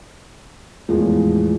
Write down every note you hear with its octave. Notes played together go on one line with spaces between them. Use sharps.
E2 A2 E3 F3 G#3